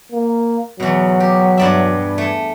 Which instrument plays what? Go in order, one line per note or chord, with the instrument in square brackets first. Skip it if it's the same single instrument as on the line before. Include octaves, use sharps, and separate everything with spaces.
[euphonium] A#3
[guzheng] E2 B2 [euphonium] F#3
[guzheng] G4
G2 D5 E5
A3